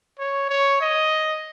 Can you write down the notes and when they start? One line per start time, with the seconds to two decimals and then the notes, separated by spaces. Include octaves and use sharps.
0.19 C#5
0.49 C#5
0.81 D#5